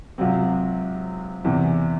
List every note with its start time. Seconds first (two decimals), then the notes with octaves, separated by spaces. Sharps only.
0.18 C#2 C3 F#3 C4
1.45 E2 C3 E3